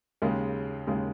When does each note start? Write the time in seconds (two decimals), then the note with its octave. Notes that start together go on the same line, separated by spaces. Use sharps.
0.22 D#2 C#3 G#3
0.87 D#2 C#3 G#3